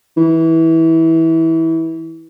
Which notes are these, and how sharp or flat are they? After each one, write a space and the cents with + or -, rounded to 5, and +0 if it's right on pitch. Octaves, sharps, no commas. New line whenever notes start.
E3 -20